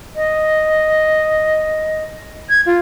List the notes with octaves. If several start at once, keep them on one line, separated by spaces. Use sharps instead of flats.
D#5
G#6
F4